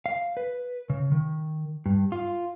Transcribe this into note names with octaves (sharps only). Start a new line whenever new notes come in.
F5
B4
C#3
D#3
G2
F4